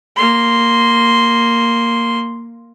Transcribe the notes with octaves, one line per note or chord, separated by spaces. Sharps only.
A#3 C6